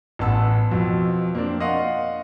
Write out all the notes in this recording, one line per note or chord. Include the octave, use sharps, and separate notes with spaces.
A1 B3 A5 E6
F2 B2
A#3 C4 D4
D#5 F5 F#5 C6 C#6